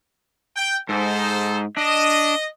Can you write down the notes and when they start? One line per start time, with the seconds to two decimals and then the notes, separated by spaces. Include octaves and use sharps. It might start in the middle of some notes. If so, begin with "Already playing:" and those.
0.56 G5
0.89 G#2 D#4 A4 C5
1.77 D4 D#5